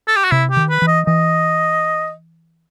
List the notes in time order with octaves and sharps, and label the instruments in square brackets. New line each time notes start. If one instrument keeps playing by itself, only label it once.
[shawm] A4
G4
F#4
[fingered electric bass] C3 [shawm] E4
[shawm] G4
[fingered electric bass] D#3
[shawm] B4
[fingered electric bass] E3
[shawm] D#5
[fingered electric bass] E3 [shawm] D#5